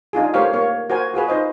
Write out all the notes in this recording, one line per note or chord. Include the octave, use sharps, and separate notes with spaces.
D4 D#4 F4 G#4
A3 G4 A#4 C5 C#5 F5
A#3 C#5
F#4 A#4 C5 G#5
F4 F#4 G#4 B4
D#4 C5 D#5